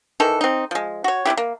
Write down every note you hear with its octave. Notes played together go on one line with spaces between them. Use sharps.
D#3 E3 A4
C4 D#4
F3 G#3
F#4 C#5
C3 G#3 E4 G4
A#3